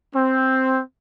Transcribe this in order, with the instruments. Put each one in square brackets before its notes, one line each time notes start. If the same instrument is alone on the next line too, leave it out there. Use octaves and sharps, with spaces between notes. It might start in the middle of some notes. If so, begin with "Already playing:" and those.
[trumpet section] C4